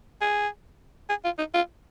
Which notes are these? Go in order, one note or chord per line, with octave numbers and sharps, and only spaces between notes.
G#4
G#4
F4
D#4
F4